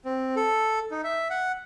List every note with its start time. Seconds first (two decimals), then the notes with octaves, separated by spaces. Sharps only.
0.05 C4
0.36 A4
0.91 D#4
1.04 E5
1.30 F#5